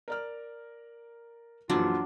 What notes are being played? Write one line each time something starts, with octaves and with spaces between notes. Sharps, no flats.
A#4 D5 F6
A#1 F#2 E3 F#3 D4 F4